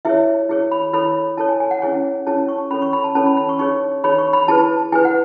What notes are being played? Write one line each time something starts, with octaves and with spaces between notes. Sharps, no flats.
E4 G#4 C#5 E5
E4 G#4 C#5
B5
E4 A4 C#5 B5
E4 A4 C#5 A5
G#5
G#5
F#5
C#4 E4 G#4 C#5 G#5
C#4 E4 G#4 C#5 A5
C#6
C#4 E4 A4 C#5 B5
C#6
B5
A5
C#4 E4 A4 C#5 A5
B5
B5
C#6
D#4 G#4 C#5 C#6
D#4 G#4 C#5 B5
C#6
B5
E4 G#4 B4 A5
E4 G#4 B4 G#5
F#5